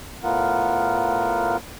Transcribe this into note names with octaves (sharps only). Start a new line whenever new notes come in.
A2 B3 F4 A#4 F#5